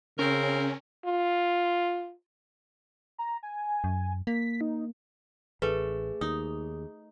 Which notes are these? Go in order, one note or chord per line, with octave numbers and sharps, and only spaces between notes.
C#3 C4 C#4 A#4
F4
A#5
G#5
F#2
A#3 B6
D#4
A1 A3 G#4 B4
D#2 D#4 D#6